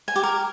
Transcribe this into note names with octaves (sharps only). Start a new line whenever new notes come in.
G#5
G4
A#4